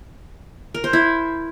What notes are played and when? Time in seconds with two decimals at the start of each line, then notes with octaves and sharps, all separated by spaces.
0.75 A#4
0.84 C5
0.93 E4